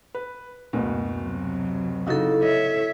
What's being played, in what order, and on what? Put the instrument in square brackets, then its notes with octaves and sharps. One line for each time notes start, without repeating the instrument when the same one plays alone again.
[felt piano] B4
F#1 D2 B2
[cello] C3 F#3
[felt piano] C#3 D#4 F#4 [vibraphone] E4 A4
[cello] C#5 E5 [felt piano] D#5